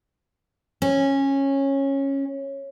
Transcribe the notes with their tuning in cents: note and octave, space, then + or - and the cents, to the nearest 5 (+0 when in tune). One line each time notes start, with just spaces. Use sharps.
C#4 -15